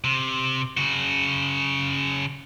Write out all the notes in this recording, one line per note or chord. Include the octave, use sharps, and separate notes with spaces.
C3
C#3 F#4